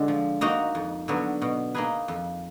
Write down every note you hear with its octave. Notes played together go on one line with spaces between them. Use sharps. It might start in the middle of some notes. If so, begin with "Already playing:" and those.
Already playing: D3 G#3
F3
A#3 D#4 F#4
F2
D3 F#3 B3
B2
A#3 D#4 G#4 B4
F2